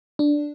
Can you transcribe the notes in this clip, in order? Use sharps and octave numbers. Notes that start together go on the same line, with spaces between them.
D4